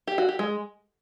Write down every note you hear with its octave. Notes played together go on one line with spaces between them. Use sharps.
G4
F#4
G4
G#3